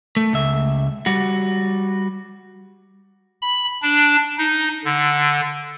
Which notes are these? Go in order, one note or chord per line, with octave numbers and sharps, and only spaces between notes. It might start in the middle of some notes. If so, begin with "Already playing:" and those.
A3
C#2 E5
G3 F#4
B5
D4
D#4
D3